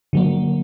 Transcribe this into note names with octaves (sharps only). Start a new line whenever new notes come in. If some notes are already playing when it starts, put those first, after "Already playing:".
D3 F#3 A#3